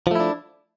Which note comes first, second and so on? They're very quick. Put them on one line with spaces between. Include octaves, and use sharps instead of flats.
F3 A3 E4 D4